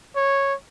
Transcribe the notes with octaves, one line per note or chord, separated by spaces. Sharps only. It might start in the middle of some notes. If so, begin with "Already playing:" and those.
C#5